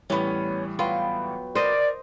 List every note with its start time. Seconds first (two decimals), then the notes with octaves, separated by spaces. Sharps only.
0.10 A2 E3 G3 B3 C#4
0.79 F#3 B3 F4 G5
1.55 A#4 C5 D5 D#5